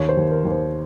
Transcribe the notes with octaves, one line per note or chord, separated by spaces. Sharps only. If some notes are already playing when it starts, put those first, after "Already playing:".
Already playing: D#2 C#5
C5
D#2
A#4
D#2
C5